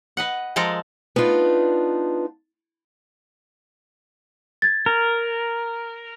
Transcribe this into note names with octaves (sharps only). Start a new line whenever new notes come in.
B4 D#5 F#5
F3 G#3 A4 A#4
B3 D4 D#4 F4
G#6 A6
A#4